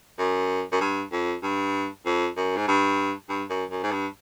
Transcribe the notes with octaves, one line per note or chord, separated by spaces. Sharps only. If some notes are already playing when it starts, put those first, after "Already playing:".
F#2
F#2
G2
F2
G2
F2
F#2
G#2
G2
G2
F#2
F#2
G#2
G2